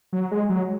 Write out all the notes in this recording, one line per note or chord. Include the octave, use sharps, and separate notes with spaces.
F#3
G#3
F#3